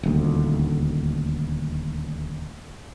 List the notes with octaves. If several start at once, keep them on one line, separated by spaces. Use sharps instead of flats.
D#1 D2